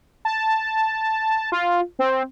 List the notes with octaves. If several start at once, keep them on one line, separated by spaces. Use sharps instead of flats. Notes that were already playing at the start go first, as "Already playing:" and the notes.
A5
F4
C4